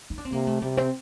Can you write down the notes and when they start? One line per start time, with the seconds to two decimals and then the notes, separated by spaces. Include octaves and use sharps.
0.10 D#4
0.18 D4
0.25 C4
0.32 C3 A#3
0.47 A3
0.62 C3 G3
0.77 C4